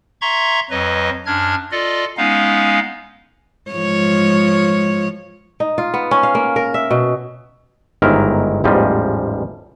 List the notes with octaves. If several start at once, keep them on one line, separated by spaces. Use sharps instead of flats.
E5 A#5 C6 C#6 G#6
F2 F#3 B4 D#5
F#2 D4 F6 G#6
F4 A4 D5 D#5
G#3 B3 C#4 D#4 F5
G#2 F3 C#5
D#4
F4
B3
C#4
F5
A#3
A#4
E5
B2
G1 G#2 D#3 E4 A#4
A1 E2 G#2 F3 G3 D#5